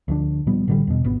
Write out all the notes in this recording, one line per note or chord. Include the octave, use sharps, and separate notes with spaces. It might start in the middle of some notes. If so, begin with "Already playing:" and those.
D2 F3 D4
A#2 F3 G3 B3
A1 D3 G3
E2 B2
G#1 B3